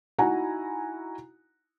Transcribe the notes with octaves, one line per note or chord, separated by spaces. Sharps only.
D#4 E4 F#4 F#5 G#5 A#5